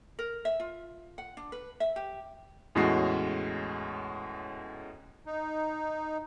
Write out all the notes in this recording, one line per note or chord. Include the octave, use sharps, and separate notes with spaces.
A#4
E5
F4
F#5
D4
B4
E5
G4
E2 A2 G#3 C#4 F#4 C7
D#4